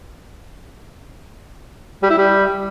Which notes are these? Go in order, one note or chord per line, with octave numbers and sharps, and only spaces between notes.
G3
E4
G3